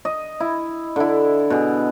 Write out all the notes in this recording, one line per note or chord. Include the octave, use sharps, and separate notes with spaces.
D#5
E4
D3 E4
B2 G#4